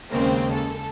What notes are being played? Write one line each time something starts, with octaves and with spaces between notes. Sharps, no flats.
D#2 C#3 G#3 A#3 C4
A4